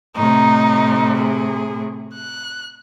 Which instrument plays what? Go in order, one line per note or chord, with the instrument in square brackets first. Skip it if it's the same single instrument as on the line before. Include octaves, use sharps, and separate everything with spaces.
[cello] A2 C3 [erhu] D#4
[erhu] G#4
F#6